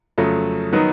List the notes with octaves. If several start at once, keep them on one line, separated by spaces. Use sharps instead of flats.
F2 C#3 F#3 A3
D#3 F#3 B3 D#4